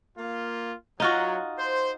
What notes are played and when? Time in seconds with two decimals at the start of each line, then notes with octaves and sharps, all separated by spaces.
0.17 A#3 F4
1.00 F#3 D#4 F4 F#4
1.58 C5